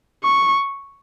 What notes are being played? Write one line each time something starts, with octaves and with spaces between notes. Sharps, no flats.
C#6